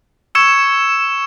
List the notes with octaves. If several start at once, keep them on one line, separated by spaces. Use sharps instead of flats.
C#6 E6 G#6 C#7 E7